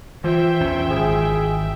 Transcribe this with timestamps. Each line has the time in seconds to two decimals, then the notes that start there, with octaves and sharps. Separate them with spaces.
0.24 E3 F4 C5 E5 G5
0.60 A#1 E2 C#4
0.90 G#1 G#4